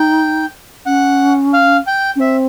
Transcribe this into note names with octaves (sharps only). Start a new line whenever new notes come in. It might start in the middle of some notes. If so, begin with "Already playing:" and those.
Already playing: D#4 G5
C#4 F#5
F5
G5
C#4
C4 E5